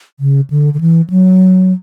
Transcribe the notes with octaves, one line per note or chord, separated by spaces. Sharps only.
C#3
D3
D3
E3
F#3